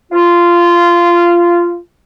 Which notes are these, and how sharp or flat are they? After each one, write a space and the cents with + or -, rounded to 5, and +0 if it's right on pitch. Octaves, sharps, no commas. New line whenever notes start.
F4 -15